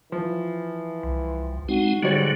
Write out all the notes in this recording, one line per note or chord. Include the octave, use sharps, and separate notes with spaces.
E3 F3
C2
G#3 C4 D#4 F#4
G#2 D3 F#3 G3 F#4 C#5